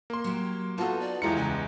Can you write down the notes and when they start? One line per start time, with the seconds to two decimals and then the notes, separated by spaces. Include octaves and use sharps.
0.10 A#3 C6
0.24 F#3 G4
0.78 B3 D#4 F4 F#4 A4 A5
1.00 D5
1.22 E2 G#3 E4 F4 G4 A#5 C#7
1.37 C#2 G#5